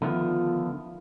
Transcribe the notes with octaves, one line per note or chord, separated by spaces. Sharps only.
D3 D#3 F3 A3 B3 F4